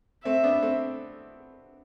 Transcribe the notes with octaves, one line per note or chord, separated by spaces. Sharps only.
A3 C4 E5
B3 D4
A3 C4